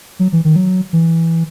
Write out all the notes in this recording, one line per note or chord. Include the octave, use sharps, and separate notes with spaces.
F#3
E3
D#3
F#3
E3